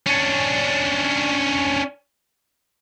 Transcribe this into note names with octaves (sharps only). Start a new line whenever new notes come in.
C#4 D4